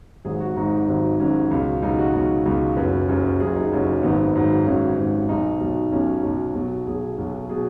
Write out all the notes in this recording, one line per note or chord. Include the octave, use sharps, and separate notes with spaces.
G#1 G#2 F#3 G#4
F#4
G#1 G#2 F#3 D#4
G#1 G#2 F#3
G#1 G#2 F#3 C#4
C#2 B2 F#3
C#2 B2 F#3 D#4
F#4
C#2 B2 F#3
C#2 B2 F#3
F#1 F#2 F#3 B4
F#1 F#2 F#3
F#1 F#2 F#3 G#4
D#4
F#1 F#2 F#3
G#1 G#2 F#3 B3
G#1 G#2 F#3
G#1 G#2 F#3 C#4
G#1 G#2 F#3
B1 B2 F#3 D#4
B1 B2 F#3
B1 B2 F#3 C#4
B1 B2 F#3
B1 B2 F#3
B1 B2 F#3 G#4
B1 B2 F#3
B2 F#3 G#4